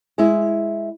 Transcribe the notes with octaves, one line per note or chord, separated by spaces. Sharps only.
G#3 E4